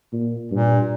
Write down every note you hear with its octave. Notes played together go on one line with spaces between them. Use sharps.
A#2
G2 A#2